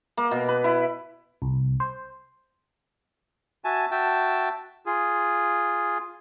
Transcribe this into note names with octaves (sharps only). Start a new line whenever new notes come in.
A#3
B2
B4
E4
C2
C5
F#4 E5 G#5 A5
F#4 E5 G5 A5
F4 G#4